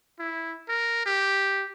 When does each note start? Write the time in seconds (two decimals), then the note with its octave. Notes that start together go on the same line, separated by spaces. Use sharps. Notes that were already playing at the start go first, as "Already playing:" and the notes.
0.19 E4
0.69 A#4
1.06 G4